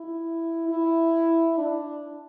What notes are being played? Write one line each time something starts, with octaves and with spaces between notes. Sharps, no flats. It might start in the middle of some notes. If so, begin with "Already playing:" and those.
Already playing: E4
E4
D4